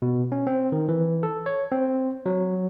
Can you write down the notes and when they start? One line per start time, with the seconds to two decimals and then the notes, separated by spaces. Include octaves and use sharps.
0.02 B2
0.32 C#4
0.47 C4
0.72 D#3
0.89 E3
1.23 A4
1.46 C#5
1.72 C4
2.26 F#3